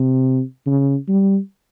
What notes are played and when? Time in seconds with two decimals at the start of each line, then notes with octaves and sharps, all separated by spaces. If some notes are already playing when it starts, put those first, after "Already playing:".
Already playing: C3
0.66 C#3
1.08 G3